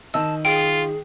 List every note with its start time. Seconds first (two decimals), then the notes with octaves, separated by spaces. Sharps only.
0.14 D#3 D#5 A5 E6
0.45 F4 G#4 G5